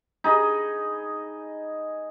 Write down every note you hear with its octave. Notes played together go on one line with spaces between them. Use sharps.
D#4 G#4 D#5 B5